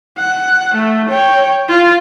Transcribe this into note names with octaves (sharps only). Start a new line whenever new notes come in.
F#5
A3
C#5 G5
F4